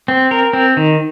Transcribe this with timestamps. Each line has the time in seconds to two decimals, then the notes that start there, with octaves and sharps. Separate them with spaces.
0.08 C4
0.31 A#4
0.53 C4
0.77 D#3